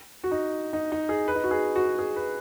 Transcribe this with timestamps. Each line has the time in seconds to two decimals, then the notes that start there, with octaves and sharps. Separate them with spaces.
0.24 F#4
0.31 D#4
0.73 D#4
0.92 D#4
1.09 G#4
1.28 B4
1.35 D#4
1.44 F#4
1.51 G#4
1.76 F#4
1.99 G#4
2.16 B4